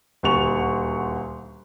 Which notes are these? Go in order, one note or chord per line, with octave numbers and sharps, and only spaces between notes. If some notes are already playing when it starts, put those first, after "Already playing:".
D#1 D2 C#6 F7